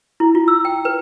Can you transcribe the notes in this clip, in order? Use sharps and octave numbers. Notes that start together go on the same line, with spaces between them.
E4
F4
E6
G5
B4